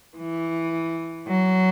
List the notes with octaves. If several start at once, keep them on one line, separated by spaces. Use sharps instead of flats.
E3
F#3